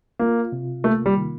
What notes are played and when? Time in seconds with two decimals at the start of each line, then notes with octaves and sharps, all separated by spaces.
0.19 A#3 F4
0.52 C3
0.84 A3 A#3
1.06 G3
1.16 D#3